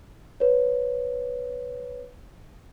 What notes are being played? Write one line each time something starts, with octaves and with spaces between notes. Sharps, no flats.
B4 C#5